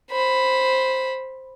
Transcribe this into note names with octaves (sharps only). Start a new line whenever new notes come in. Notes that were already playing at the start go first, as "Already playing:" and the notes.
C5 B5